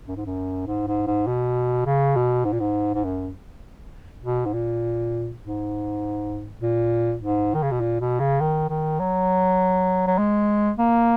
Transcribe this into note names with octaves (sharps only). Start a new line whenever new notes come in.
F#2
G#2
F#2
G#2
G#2
G#2
B2
C#3
B2
G#2
A#2
G#2
G#2
F#2
B2
G#2
A#2
G#2
A#2
G#2
D#3
C#3
B2
A#2
B2
C#3
D#3
D#3
F#3
F#3
G#3
A#3